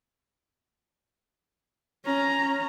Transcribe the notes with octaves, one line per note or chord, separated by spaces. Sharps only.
C#4 A#5